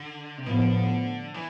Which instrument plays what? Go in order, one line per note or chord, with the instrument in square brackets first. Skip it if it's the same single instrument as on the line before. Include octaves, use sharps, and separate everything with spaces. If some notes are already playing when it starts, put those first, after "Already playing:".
Already playing: [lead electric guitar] D3
C3
[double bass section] A2 F3 B3 [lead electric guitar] D3
[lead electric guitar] E3